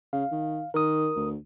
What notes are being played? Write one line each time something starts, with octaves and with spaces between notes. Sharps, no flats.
C#3 F5
D#3
D#3 A#4 D#6
D2